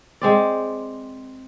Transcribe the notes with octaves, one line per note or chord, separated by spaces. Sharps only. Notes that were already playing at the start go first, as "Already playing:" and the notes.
G#3 C4 D5